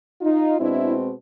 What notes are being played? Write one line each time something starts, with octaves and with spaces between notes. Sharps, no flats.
D#4 F4
B2 G#3 C4 D4 E4